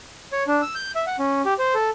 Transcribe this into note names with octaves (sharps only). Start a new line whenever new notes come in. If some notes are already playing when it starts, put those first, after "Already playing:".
C#5
D4
E6
G6
E5
F#5
C#4
G4
C5
A4